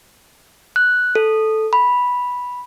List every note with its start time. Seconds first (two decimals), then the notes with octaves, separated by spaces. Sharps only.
0.76 F#6
1.15 A4
1.73 B5